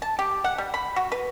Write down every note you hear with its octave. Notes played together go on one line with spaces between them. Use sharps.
A5
G4
F#5
G3
B5
F#4
B4